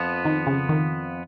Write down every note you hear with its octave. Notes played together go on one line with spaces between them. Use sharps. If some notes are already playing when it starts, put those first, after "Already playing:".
Already playing: F2 F3 B3
D#3
C#3
D#3